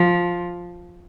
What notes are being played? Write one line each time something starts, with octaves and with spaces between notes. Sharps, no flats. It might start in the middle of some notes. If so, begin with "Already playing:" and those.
Already playing: F3